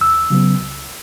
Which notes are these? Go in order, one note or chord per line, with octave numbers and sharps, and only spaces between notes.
E2 E6
C#3 F#3 B3
C#2